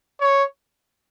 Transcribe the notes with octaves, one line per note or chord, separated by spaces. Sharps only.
C#5